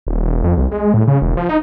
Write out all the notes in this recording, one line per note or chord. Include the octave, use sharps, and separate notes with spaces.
D#1
E1
F2
C2
G#3
A2
C#3
E1
F3
D#4